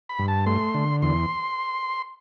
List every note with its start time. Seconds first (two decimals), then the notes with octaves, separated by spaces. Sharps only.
0.09 B5
0.19 G2
0.28 A5
0.46 A3 C6
0.74 D3
1.02 E2 C6